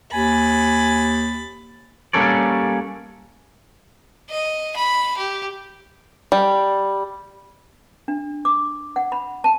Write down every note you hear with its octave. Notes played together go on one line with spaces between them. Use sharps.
D#2 G#5 B5 A6
G3 A#3 C#4 A4 C#5 D5
D#5
B5
G4
G3
D4
D6
F#5
B5
A5